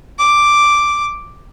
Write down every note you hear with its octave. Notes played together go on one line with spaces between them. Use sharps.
D6